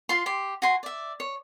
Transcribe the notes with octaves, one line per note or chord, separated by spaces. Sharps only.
F4 C6
G4 C6
F#4 G#5 C6
D5 E5
C#5